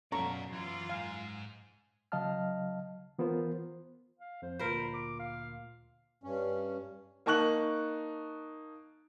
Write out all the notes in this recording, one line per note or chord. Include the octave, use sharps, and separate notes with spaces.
F#2 B2 C#4 A4 D5 F5 A#5 C#6
F#2 E3 F4
G#2 F5 G#5
C#3 F#3 D#5 F5 A5 F6
E3 B3 F4 A#4 C5
F5
F2 C5
D2 A#2 F4 A#4 C5 B5
D6
F5
G2 C#4
A#3 D#4 A5 C#6 F#6 F#7